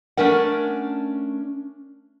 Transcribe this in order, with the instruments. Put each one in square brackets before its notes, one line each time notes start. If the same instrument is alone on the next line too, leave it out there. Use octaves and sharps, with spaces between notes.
[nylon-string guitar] A3 C#4 D4 A#4 F#5